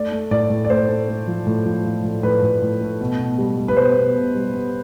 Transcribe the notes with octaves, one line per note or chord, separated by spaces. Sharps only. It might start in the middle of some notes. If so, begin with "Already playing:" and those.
Already playing: A3 D5
A3
A2 D5
A2
D5
A3 C5
A3
A3
F3
A2
F3
F3
A2
A2 B4
A2
A2
A3
B2
B2
G3
G3
B4
B2 C5
B2
B2
G3
B3